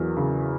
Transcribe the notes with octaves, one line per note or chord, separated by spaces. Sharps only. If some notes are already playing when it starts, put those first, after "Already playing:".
Already playing: E2 F#3 A#4
C#3